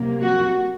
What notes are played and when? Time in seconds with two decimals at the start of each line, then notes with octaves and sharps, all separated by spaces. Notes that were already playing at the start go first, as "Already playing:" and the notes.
Already playing: C3 F#3 A#3
0.23 F#4